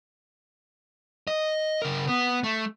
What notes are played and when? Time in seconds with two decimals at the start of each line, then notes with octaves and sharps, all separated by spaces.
1.27 D#5
1.82 C#3 A#4
2.08 B3
2.44 A3